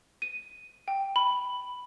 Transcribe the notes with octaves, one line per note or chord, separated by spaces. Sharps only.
D#7
G5
B5